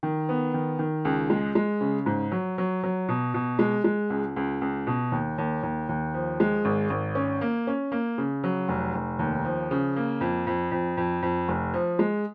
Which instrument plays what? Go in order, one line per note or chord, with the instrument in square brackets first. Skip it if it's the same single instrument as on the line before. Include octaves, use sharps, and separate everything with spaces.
[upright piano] D#3
B3
D#3
D#3
C#2
G#3
G#3
C#3
G#2
F#3
F#3
F#3
B2
B2
G#3
G#3
C#2
C#2
C#2
B2
D#2
D#2
D#2
D#2
F3
G#3
G#1
G#1
C#4
A#3
C#4
A#3
C#3
F#3
F1
F1
D#2
F3
C#3
A#3
F2
F2
F2
F2
F2
F1
F3
G#3